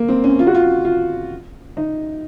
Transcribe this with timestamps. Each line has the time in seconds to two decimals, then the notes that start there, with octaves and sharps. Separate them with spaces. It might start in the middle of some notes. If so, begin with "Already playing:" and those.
Already playing: A#3
0.08 C4
0.24 C#4
0.39 F4
0.47 F#4
0.55 F4
0.85 F4
1.77 D#4